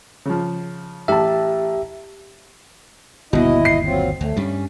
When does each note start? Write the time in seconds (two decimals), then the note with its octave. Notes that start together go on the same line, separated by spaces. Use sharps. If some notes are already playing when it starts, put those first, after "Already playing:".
0.26 C#3 F3
1.08 A1 G4 E5 A5
3.33 G1 D#2 B2 E4 D#5
3.65 C7
3.86 F#3 C4 F4
4.21 D2 A3
4.36 G2 G3 C#4